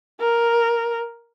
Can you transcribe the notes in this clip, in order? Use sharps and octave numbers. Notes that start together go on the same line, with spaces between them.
A#4